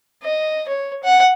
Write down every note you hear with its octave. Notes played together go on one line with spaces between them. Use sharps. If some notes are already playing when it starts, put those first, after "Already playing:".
D#5
C#5
F#5